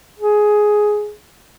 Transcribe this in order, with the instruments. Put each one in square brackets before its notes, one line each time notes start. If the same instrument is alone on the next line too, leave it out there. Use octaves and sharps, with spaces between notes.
[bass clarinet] G#4